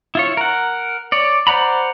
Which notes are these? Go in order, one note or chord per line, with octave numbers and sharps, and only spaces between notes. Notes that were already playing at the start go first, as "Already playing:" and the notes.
E4 F4 C#5
A#4 F#5
C#5 D5
C5 D5 F#5 A#5 B5